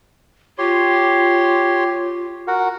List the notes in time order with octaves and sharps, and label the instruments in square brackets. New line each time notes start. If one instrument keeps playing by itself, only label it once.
[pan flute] F4 [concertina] G4 C#5 C6
[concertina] F#4 A#4 F#5